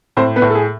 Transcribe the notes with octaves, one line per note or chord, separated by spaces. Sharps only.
A2 C4 C5
B3 B4
A2
A4
G#4